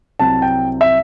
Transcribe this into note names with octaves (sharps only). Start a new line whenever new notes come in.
C2 C3 F#3 A5
G5
E5